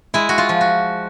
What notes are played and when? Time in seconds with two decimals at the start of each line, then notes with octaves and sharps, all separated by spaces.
0.14 G#3 E4
0.29 F#4
0.38 F4
0.49 F3
0.61 F#4